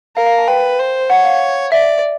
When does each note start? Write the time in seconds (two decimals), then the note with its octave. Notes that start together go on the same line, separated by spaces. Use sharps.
0.16 A#4 F5
0.26 F5
0.38 A5
0.47 B4 G5
0.79 C5
1.10 C#5 F#5
1.25 F5
1.72 D5 E5